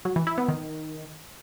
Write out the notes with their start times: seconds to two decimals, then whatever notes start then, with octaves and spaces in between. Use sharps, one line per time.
0.05 F#3
0.16 E3
0.27 E4
0.38 B3
0.48 D#3